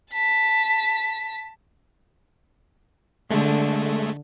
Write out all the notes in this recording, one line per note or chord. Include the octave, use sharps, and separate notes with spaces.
A5 B6
D3 G#3 A3